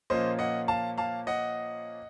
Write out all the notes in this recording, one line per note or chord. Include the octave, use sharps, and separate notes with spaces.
A#2 F3 A#3 C#4 F4 C5 D#5
D#5 F#5
F5 A5
F5 A5
D#5 F#5